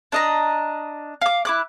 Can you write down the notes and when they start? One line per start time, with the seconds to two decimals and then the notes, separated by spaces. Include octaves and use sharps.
0.12 D4 D#5 A#5
1.21 F5 D6
1.45 E4 D6 F#6